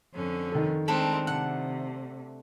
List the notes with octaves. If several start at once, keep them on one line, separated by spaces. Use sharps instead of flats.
F2 D3 C#4
D#3 A4
G#3 A3 C4 D4 A#4 B5
C3 F#5